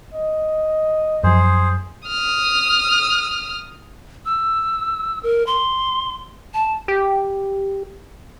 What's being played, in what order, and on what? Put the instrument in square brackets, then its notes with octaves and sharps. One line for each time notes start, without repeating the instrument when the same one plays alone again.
[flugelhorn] D#5
[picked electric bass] F#2 F3 [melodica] G#4 C5
[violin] D#6 F6
[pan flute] E6
A#4
C6
A5
[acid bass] G4